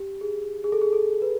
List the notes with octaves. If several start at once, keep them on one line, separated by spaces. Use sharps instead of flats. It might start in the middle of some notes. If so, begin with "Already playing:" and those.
Already playing: G4
G#4
G#4
A4
G#4
A4
B4